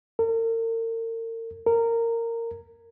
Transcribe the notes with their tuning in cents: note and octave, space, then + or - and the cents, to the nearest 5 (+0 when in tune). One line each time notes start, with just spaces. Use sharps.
A#4 -40
A#4 -15